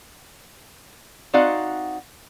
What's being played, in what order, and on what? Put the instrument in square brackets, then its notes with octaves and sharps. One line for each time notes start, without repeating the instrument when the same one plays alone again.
[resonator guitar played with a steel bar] C4 D#4 F#4 D5 F5 F#5